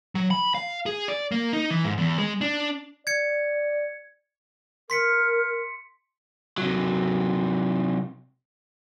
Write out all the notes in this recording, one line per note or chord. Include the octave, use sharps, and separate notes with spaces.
F#3
B5
F5
G#4
D5
A#3
D#4
E3
G#2
E2
G#3
D4
D5 G#6 C#7
A#4 C6 B6 C#7
C3 F#3